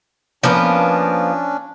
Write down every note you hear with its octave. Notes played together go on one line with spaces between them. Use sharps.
F3 A#3 B3 C#4 D4